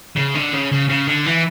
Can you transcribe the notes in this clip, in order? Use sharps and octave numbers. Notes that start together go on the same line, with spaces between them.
C#3
D3
C#3
C#3
C#3
D3
E3